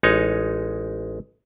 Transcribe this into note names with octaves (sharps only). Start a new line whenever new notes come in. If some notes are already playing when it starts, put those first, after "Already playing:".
A1 G#3 D#4 C#5